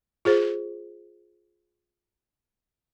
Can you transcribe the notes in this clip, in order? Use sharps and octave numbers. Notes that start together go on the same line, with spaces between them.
F4 G#4 C5